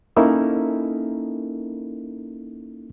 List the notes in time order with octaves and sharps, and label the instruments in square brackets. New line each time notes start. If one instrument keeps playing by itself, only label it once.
[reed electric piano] A#3 C#4 D#4 E4 A4 A#4